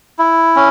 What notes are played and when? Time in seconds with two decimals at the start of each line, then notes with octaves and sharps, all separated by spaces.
0.19 E4
0.56 C#4